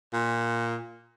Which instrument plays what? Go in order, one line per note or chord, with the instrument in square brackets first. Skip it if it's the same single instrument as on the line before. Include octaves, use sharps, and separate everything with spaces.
[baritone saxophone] A#2